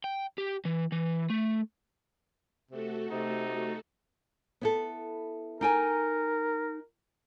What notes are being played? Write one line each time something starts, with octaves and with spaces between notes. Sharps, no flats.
G5
G4
E3
E3
A3
C3 A3 F#4 A4
C3 D#4
B3 E4 A4
D#4 A#4 G5 G#5